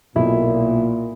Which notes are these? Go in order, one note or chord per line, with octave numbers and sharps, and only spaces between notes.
B1 A#2 E4